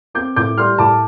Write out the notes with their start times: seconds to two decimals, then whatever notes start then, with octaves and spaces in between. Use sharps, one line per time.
0.14 C4 D6 G6
0.36 A2 D6 G6
0.57 G3 C6 F6
0.78 A2 A5 D6